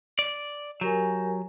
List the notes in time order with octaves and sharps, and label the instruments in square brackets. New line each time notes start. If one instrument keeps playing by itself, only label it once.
[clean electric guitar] D5
[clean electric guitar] F#3 [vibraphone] G4 A#4 G#5